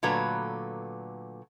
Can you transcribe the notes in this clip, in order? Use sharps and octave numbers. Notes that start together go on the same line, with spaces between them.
A#2 D3 F#3 A3 B4 A#5